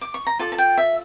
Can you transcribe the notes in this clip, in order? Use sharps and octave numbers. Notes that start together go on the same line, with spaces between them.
D6
C#6
A#5
F4 A4 D5 A5
A5
G5
E5